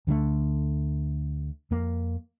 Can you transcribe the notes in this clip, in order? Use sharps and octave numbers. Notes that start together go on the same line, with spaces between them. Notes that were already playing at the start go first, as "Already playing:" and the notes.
D2 D3 E3 A3
F2 A#3